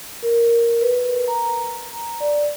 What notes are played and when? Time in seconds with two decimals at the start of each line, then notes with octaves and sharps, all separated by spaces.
0.23 A#4
0.81 B4
1.28 A#5
2.20 D5